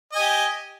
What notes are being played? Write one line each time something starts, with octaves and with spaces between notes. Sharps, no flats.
G4 D#5 G#5